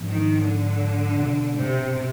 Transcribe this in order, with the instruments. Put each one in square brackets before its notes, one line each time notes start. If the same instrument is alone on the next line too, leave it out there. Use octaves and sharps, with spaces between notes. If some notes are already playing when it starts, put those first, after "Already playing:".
Already playing: [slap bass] G#2 F3 B3 D4
[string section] D#3
D3
[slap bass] B2 B3 D4
[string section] C3